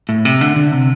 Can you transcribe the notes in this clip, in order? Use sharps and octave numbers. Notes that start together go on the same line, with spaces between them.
A2
C3
D3
D3
C3